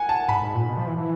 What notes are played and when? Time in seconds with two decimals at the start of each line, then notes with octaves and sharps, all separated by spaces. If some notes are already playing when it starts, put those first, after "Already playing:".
Already playing: F#5 G#5
0.09 A5
0.28 G#2 B5
0.42 G#2
0.55 A#2
0.68 B2
0.77 F3
0.87 E3
0.98 E3